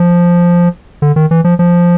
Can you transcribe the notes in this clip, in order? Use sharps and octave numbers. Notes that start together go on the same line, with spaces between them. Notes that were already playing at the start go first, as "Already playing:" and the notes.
Already playing: F3
D3
D#3
E3
F3
F3